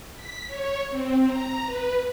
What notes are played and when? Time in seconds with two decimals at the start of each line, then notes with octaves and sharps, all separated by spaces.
0.15 B6
0.47 C#5
0.90 C4
1.25 A#5
1.65 B4